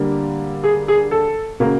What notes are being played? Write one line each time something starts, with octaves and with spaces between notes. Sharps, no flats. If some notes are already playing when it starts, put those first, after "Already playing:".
Already playing: D3 G3 A#3
G#4
G#4
A4
C#3 F#3 A#3